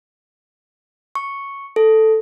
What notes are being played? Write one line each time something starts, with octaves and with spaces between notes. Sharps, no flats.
C#6
A4